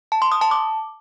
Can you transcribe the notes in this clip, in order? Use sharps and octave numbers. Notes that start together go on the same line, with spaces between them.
A5
C6
D#6
A5
D6